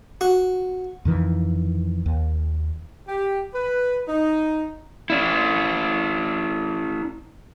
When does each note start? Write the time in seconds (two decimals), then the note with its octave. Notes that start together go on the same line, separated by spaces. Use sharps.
0.21 F#4
1.05 F2 D#3 E3
2.06 D#2
3.08 G4
3.54 B4
4.08 D#4
5.10 C#4 E4